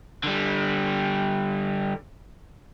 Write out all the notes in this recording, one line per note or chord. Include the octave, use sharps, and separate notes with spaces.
D3 G3